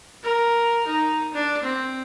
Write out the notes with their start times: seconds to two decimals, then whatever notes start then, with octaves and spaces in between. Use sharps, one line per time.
0.23 A#4
0.87 D#4
1.34 D4
1.63 C4